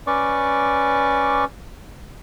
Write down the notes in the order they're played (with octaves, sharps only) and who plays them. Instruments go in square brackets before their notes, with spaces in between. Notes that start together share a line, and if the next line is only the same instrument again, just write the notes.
[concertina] C#4 B4 D5 C#6 D6